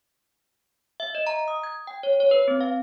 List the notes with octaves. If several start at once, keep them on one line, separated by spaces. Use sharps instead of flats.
E5
D#5
A#5
D#6
G#6
G5
C#5
C#5
B4
C4
F5